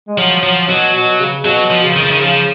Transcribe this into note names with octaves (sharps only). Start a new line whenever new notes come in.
G#3
F3 F#3
F3 F#3
B2 F#3
B2
C#3
B2 F#3
F3
C#3
D#3
F3
D#3
C#3 F3